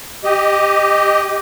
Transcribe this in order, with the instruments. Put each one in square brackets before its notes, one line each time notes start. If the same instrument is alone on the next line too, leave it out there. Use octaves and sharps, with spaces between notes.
[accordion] G4 D#5